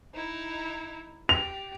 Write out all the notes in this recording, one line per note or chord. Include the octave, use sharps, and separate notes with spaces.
D#4 E4
G4 F7